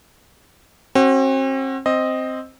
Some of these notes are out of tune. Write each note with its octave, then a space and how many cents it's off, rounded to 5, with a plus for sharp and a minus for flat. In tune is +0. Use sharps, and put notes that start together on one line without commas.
C4 +40 F#4 +25
C4 +0 D#5 +0